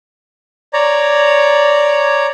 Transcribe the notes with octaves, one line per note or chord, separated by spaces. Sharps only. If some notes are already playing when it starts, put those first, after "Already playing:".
C#5 D5 A#5